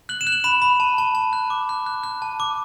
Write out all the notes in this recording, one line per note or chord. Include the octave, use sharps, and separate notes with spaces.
F#6 F#7
E7
F#6
F#7
B5 E7
B5
A5
A5
A5
F#6
D6
F#6
F#6
F#6
A5
D6